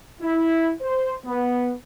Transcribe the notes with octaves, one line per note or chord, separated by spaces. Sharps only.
E4
C5
B3